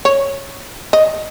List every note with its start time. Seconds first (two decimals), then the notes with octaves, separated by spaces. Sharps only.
0.05 C#5
0.93 D#5